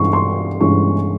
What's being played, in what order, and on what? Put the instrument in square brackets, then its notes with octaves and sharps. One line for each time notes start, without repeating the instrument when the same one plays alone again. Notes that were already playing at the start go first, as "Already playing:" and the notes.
Already playing: [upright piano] G2 E3 G#3 C#4 C6 C#6
C6
G2 E3 G#3 C#4 C#6